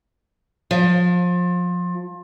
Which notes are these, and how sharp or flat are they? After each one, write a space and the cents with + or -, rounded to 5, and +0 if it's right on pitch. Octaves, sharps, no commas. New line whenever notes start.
F3 +25